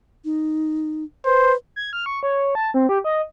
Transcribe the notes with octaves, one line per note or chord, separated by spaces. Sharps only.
D#4
B4 C5
G#6
F6
C#6
C#5
A5
C4
G4
D#5